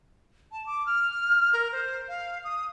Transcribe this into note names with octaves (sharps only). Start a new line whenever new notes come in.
A5
D6
F6
A#4
C5
F5
D#6